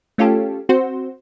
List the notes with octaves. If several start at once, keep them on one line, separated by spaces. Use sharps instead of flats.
A3 C#4 F4 G4 A4
C4 F#4 C5